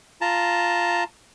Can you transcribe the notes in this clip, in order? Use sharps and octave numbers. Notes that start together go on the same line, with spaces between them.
F4 A5 A#5